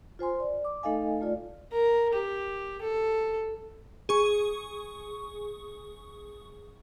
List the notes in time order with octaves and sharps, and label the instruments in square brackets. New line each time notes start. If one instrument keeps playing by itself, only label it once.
[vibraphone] F4 C5 G#5 C6
D5
D6
A3 D#4 A4 D#5 F5 G#5
A3 F4 D5
[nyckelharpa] A#4
G4
A4
[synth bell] G#4 C#6